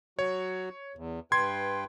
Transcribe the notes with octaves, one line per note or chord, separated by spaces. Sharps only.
F#3 F#4 C#5
E2
G2 B4 G5 C6 G#6